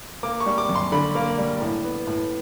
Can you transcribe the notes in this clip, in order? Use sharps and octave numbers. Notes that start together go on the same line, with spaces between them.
A#3 D6
C#6
G3
D6
F#2
C6
D3 B5
A#3
G3
A2
B3
A2